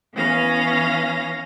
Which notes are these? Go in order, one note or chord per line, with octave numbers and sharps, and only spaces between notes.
E3 B3 C#4 F5 A#6